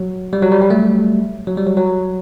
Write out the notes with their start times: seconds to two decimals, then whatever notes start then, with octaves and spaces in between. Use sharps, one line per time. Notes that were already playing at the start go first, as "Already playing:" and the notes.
Already playing: F#3
0.33 G3
0.42 F#3
0.52 G3
0.62 G3
0.70 F#3 A3
1.47 F#3
1.57 G3
1.66 F#3
1.77 F#3